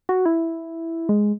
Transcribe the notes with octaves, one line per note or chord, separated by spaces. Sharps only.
F#4
E4
G#3